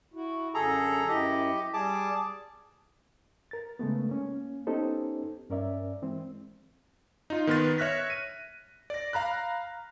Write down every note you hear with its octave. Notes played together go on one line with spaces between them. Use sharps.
E4 F#4
F#2 D3 G#4 A4 A#5
F#2 E4 G4 D#5
G3 G#4 A5 D6
A#4 A6
C#3 G#3 A3 B3
A#3 C#4
B3 C#4 D#4 G4 A4 C5
G2 C#4 A#4 D5 E5
E3 G#3 C4
D#4 F4
D#3 B3 B4 C6 A6
C#5 E5 F6 F#6 A#6 B6
D#7
D5 A#6
F5 A#5 B5 F#6